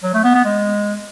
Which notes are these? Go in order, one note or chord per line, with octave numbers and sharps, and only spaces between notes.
F#3
A3
B3
B3
G#3